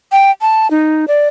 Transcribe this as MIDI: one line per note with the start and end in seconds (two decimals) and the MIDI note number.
0.12 0.31 79
0.41 0.70 81
0.71 1.05 63
1.08 1.28 74